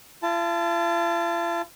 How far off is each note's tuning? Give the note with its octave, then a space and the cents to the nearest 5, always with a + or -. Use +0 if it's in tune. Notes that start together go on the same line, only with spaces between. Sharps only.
F4 -45 A5 +0